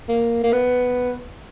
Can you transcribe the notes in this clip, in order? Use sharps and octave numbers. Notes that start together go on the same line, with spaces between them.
A#3
A#3
B3